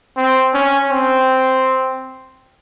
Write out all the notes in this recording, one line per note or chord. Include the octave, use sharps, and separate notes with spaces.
C4
C#4
C4